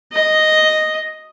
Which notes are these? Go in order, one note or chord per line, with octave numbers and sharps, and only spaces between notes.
D#5